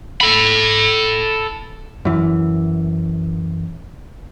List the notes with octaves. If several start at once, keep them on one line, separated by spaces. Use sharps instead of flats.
A4 B5
F#2 E3